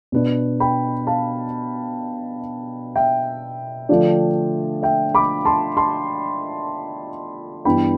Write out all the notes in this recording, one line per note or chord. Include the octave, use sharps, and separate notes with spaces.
B2 B3 D4
G5 B5
F5 A5
E5 G5
D3 F3 A3 D4
E5 G5
B5 D6
A5 C6
A5 C6
G2 E3 B3 D4 G5 B5